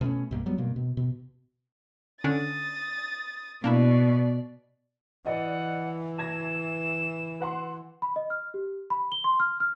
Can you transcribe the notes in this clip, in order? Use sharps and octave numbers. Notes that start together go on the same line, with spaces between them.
B2 A3 B3 C#4
B1 G2 A#3
F#3 G3 B3
G2 B2 A#3
B2
B2
D3 C#4 D4 D#6 A6
B2 A#3 D4 E4 D5
E3 D5 D#5 F#5
A5 G#6 A#6 E7
B4 F#5 C6
B5
D#5
F6
G4
B5
G7
C6
F6
F6